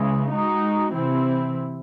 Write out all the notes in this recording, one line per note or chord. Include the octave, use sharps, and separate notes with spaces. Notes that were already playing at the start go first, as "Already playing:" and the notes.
Already playing: C#3 E3 G#3
G#3 D#4 F#4
C3 E3 C4 E4